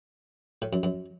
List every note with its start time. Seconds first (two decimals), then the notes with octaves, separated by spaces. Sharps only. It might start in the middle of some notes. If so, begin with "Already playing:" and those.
0.62 A2
0.73 F#2
0.83 F#2